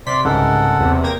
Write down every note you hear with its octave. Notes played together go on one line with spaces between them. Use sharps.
C3 D5 C6 B6
C2 G#2 C#3 G#3 A4 A#4 F#5
E2 C3
A#3 G5 A#5 G#6 A#6